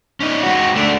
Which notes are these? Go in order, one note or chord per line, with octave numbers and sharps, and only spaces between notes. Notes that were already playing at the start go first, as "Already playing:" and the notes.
C#4 D#4
G#3 F#4
A3 D4